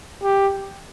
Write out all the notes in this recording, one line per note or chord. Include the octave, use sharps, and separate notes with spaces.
G4